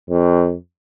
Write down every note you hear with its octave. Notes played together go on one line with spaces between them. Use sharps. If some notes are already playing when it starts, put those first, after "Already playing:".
F2